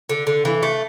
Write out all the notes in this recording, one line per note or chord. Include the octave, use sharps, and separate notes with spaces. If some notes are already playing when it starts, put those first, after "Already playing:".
D3
D3
E3
A3